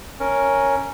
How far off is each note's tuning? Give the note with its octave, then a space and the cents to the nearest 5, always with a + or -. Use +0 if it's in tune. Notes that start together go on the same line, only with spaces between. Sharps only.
C#4 +0 A#4 +0